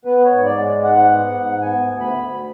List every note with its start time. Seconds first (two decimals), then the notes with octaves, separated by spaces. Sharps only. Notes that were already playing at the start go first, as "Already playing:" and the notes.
0.05 B3 B4
0.25 C#5
0.31 G#2
0.44 D5
0.57 G#3
0.83 G#2 F#5
1.09 B3
1.35 G#2
1.61 B3 G#5
1.87 D2
2.00 B5
2.13 D2